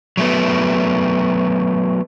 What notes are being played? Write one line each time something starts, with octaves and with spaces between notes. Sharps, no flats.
F#3 A3 B3